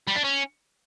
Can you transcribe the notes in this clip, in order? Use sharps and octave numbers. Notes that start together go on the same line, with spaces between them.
G3
D4
C#4